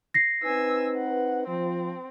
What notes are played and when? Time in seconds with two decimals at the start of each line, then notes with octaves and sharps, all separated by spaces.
0.14 A#6 C7
0.43 C4 D#4 B4 G#5 E6
0.96 F#5
1.47 F3 C4